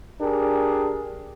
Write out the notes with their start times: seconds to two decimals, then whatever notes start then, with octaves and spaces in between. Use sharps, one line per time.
0.21 D4 G4 G#4 A#4